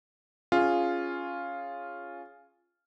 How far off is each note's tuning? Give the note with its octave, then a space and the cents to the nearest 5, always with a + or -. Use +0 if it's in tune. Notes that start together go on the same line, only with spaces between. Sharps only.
C#4 +0 F4 +0 G#4 +0